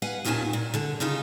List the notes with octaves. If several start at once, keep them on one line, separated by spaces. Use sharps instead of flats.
B4 F5 F#5 G#5
D#2 A#2 D#3 C#4 G#5 A5
A#2
D3 A4
C#3 D#4 F4 A4